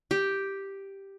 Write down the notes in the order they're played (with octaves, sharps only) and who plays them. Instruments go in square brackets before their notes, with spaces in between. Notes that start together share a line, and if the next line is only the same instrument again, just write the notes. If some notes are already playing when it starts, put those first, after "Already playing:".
[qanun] G4